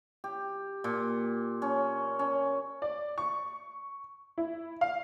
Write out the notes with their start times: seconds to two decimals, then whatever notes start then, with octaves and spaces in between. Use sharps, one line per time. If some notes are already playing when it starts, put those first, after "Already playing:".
0.24 G4
0.84 A#2
1.62 C#4
2.19 C#4
2.82 D5
3.18 C#6
4.38 E4
4.81 F5